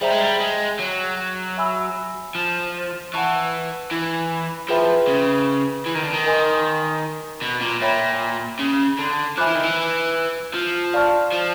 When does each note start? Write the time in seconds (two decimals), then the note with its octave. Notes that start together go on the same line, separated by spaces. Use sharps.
0.01 G3 G#4 C5 E5 G5 A#5
0.10 G#3
0.21 G3
0.40 G#3
0.80 F#3
1.57 E5 G#5 B5 E6
2.35 F3
3.14 E3 F#5 A5 C#6
3.91 E3
4.69 F3 G#4 B4 E5 G5 B5
5.08 C#3
5.86 E3
5.95 D#3
6.03 D3
6.14 D#3
6.26 A#4 D#5 G#5 C6 D#6
7.42 B2
7.62 A#2
7.82 A#2 C#5 E5 G5 B5
8.59 C#3
8.99 D3
9.37 F3 E5 G#5 B5 D6 F#6
9.47 E3
9.55 D#3
9.63 E3
10.54 F3
10.94 D5 F5 A5 C#6 F6
11.32 F3